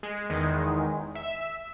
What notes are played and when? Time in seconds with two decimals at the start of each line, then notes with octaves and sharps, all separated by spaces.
0.03 G#3
0.29 E2 D#3 G#3
1.15 E5